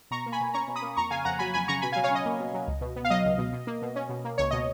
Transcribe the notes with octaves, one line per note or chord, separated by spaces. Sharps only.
B2 A#5 C#6
A#3
G#5 B5
B2
C#4 A#5 C#6
B2
B5 D#6
A#3
F2 A#5 C#6
C#3 F5 G#5
F2 F#5 A#5
F#3 G#5 B5
F2 G#5 B5
C#3 A#5 C#6
B2 G#5 B5
F#3 F5 G#5
C#5 F5
C#4 D#5
A#3
B2
F#3
C#2
B2
B3
F5
F#3 D#5
C#2
B2
B2
A#3
B2
C#4
B2
A#3
C#2 C#5
B2 D#5